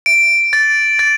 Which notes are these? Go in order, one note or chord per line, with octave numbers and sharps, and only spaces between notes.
D7
A6
A6